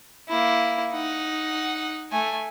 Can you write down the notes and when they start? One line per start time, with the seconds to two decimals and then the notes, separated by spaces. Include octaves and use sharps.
0.29 A#3 E4
0.92 D#4 F#5
2.12 A3 G#5